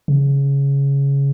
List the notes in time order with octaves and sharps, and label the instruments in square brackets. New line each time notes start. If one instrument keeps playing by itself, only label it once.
[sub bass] C#3